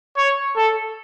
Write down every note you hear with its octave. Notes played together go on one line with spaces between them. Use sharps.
C#5
A4